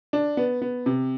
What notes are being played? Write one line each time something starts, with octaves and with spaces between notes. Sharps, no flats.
D4
B3
B3
C3